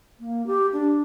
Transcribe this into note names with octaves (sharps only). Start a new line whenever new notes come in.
A#3
G4
D4